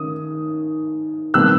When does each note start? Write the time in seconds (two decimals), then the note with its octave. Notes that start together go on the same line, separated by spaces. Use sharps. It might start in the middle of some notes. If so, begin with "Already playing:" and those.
Already playing: D#3 C#4 D#6
1.34 C3 D#3 G3 B3 E6 F#6